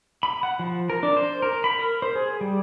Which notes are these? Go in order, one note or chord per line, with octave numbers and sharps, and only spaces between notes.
B5
F#5
F3
A#4
D4
C5
A#4
B5
A#4
C5
G#4
G3